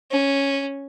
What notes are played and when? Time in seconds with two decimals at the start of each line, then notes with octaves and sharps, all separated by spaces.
0.11 C#4